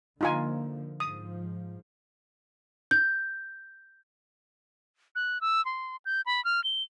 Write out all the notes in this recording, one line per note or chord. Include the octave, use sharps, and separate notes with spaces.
D3 F3 A#3 D#4 F4 G#5
G#2 F3 D#6
G6
F#6
E6
C6
G6
B5
F6
G7